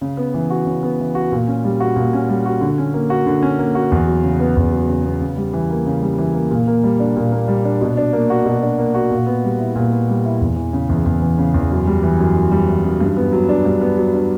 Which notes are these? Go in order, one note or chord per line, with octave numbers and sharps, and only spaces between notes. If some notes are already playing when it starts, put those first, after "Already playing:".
C#3
B3
E3
F#4
C#3
B3
E3
F#4
A#2
C#4
G3
F#4
A#2
C#4
G3
F#4
D3
C#4
A#3
F#4
D3
C#4
A#3
F#4
E2
F#3
C#3
B3
E2
F#3
C#3
B3
C#3
G3
E3
A#3
C#3
G3
E3
A#3
A#2
A#3
G3
D4
A#2
A#3
G3
D4
B2
D4
A#3
F#4
B2
D4
A#3
F#4
A#2
B3
G3
E4
A#2
B3
G3
E4
E2
E3
C#3
E2
E2
E3
C#3
E2
F#2
G3
E3
F#2
F#2
G3
E3
F#2
G2
B3
F#3
D4
G2
B3
F#3
D4